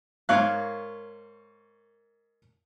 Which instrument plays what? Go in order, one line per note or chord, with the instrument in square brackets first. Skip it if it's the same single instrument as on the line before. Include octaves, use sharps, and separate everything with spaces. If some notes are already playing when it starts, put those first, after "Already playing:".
[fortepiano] G#2 C#6 F#6 [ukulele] A#4 C#5 F5